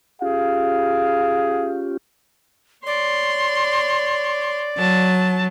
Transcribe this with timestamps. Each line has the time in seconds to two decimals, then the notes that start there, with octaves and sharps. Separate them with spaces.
0.22 C#4 F4 G4 G#4 F5
2.86 C#5 D5 C6
4.78 F#3 A5